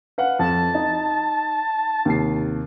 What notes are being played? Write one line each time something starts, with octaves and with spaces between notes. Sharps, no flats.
B4 F5 F#5
F2 A5
D#4
D#2 C3 C7